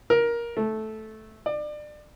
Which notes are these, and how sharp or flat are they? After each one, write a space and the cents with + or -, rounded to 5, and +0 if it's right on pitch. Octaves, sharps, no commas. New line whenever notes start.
A#4 +15
A3 -10
D5 +30